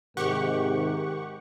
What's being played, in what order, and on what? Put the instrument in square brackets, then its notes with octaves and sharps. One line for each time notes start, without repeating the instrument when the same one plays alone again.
[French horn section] G#2 C3 D#3 [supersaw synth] G4 F#5 C#6 [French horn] A#4